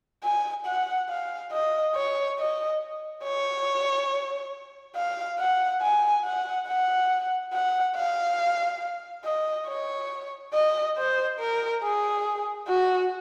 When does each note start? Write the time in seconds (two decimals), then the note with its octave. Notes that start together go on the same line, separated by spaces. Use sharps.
0.24 G#5
0.66 F#5
1.09 F5
1.52 D#5
1.95 C#5
2.38 D#5
3.23 C#5
4.96 F5
5.39 F#5
5.82 G#5
6.25 F#5
6.67 F#5
7.53 F#5
7.96 F5
9.24 D#5
9.67 C#5
10.53 D#5
10.97 C5
11.39 A#4
11.83 G#4
12.68 F#4